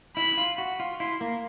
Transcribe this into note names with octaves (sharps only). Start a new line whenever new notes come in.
E4 B5
F4
F#4
F4
E4 C6
A#3